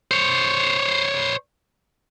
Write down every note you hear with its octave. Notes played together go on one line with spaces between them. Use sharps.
C5 C#5